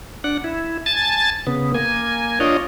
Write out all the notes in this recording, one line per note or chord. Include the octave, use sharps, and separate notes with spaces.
D4 F#5
E4
G#5 A5 A6
C#3 B3
A#3 G#5
D4 F4 C#5 D#5